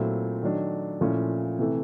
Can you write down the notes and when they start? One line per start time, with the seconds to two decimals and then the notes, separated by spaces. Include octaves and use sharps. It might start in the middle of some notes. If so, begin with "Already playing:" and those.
Already playing: A#2 F#3 A3 C4 E4
0.43 D#3 F#3 A3 D4
1.01 A#2 F3 A3 C#4 E4
1.59 C3 E3 A3